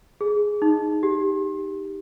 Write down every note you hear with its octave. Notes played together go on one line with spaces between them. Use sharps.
G#4
D#4
G4